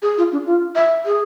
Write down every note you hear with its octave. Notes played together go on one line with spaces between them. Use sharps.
G#4
F4
D4
F4
E5
G#4